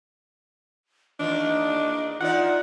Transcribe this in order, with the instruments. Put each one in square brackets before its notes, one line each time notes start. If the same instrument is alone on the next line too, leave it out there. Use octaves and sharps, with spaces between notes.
[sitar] E2 D#3 F4 [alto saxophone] D4 [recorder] D#5
[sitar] E3 D#4 D5 [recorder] F4 [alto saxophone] F#5